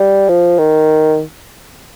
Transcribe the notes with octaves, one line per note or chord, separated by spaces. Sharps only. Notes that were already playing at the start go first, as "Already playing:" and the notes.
Already playing: G3
F3
D#3